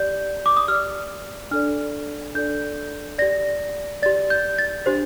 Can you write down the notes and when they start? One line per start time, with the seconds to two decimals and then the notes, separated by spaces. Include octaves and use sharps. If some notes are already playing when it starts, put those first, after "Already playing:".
Already playing: G4 D5 G6
0.46 D6
0.57 D#6
0.68 G4 D5 F6
1.51 D4 A4 D5 F6
2.35 D4 A4 D5 G6
3.19 G4 D5 A#6
4.02 G4 D5 A6
4.30 G6
4.58 A6
4.86 D4 G4 C5